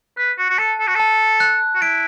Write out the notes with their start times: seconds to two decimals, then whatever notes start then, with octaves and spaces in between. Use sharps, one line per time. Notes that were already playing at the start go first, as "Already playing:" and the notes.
0.17 B4 F#6
0.38 F#4
0.50 F#4
0.58 A4 A5
0.80 A4
0.87 F#4
0.95 A4 A5
1.40 F#6
1.75 F#4
1.82 E4 D7